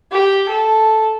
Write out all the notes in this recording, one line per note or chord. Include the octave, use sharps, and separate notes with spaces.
G4 G5
A4